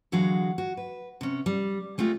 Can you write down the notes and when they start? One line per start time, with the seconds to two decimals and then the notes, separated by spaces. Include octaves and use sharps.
0.12 D3 E3 F#3 G#3 F#4 F5
0.58 F#4
0.77 B4
1.21 C3 C#4
1.46 G3
1.98 G#3 A3 C4 F4